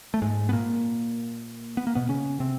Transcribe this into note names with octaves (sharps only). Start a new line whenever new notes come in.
A3
G#2 G#3
B3
A#2 A#3
B3
A#3
B2 B3
C#3 C#4
C3 C4